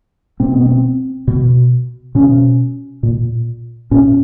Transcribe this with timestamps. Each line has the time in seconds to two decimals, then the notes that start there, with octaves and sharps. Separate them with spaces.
0.40 B2 C4
0.54 B3
0.66 C4
1.28 B2
2.15 B2 C#4
3.03 A#2
3.91 A#2 C#4